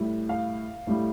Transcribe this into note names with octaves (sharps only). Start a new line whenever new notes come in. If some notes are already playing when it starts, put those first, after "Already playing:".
Already playing: A2 G3
F5
A2 G3